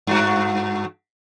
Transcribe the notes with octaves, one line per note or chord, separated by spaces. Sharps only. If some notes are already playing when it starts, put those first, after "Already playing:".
G2 F#4